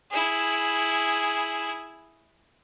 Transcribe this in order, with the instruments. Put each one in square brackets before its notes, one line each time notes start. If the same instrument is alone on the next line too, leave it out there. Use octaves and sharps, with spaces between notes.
[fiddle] E4 G#4